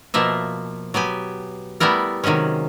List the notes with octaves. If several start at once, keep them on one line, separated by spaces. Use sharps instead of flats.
B2 F3 A#3 E5
F#3 B3 G4 G#5
G3 A3 B3 E4 A#4
C3 D#3 F#3 G#3 C#4